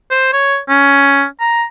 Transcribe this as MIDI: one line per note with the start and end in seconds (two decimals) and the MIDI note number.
0.11 0.30 72
0.33 0.59 73
0.69 1.25 61
1.40 1.64 82